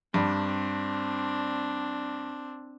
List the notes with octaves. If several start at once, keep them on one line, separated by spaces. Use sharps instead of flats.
G2 C4 D4